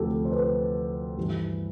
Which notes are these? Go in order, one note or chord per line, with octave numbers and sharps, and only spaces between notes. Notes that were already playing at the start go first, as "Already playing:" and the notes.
Already playing: D2 C3 F3 G4 A4
C5
B4
G2 E3 G3